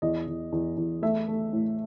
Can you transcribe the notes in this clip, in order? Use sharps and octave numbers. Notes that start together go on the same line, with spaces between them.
E2 D#5
E2
E2
E2
A3 E5
A3
A2